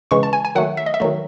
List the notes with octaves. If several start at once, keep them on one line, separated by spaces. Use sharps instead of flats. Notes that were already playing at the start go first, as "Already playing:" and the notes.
C#3 E3 G#3 C#6
A5
G#5
G#5
D#3 F#3 A3 F#5
E5
D#5
E5
D#3 F#3 A3